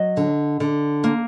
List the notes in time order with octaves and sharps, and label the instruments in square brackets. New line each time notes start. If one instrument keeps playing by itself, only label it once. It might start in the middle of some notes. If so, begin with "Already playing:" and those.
Already playing: [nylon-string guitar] F#3 D#5
D3
D3
A#3